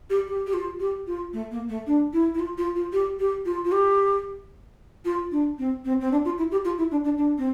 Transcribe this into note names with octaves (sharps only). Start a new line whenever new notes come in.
G4
G4
G4
F4
G4
F4
A3
A#3
A3
D4
E4
E4
F4
F4
F4
G4
G4
F4
F4
G4
F4
D4
C4
C4
C4
D4
F4
E4
G4
F4
E4
D4
D4
D4
C4